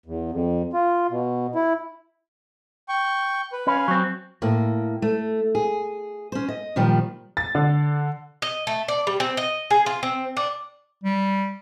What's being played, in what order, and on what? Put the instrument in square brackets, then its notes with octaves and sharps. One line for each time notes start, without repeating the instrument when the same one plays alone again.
[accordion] E2
F2
F4
B2
E4
[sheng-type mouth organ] G5 C#6
B4
[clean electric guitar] C#4 B4 [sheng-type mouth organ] F5 G#5
[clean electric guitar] F#3 C4
[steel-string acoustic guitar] A2 A#3
A3
G#4
C#4 C5
D#5
A#2 D#3 F3 G3
[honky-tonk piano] A6
D3
[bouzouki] D#5
A3
D5
G3
C4
D#5
G#4
F4
C4
D4
[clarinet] G3